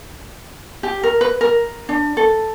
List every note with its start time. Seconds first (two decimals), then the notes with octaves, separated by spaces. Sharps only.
0.83 G4
1.03 A#4
1.21 B4
1.41 A#4
1.89 D4
2.17 A4